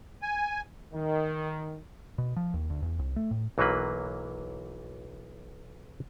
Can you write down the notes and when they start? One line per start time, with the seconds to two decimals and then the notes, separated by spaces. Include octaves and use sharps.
0.22 G#5
0.94 D#3
2.18 B2
2.36 F3
2.54 D#2
2.70 D2
2.82 E2
2.99 C2
3.16 A3
3.31 A2
3.58 B1 E3 F#3 A#3 B4